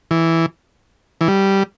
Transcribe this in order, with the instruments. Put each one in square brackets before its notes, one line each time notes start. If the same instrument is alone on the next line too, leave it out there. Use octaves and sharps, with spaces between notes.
[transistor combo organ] E3
E3
G3